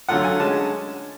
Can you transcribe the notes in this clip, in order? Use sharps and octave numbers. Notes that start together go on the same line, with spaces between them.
D3 F#3 A3 F4 F#5
G#5
D3 G#3 C#4 A5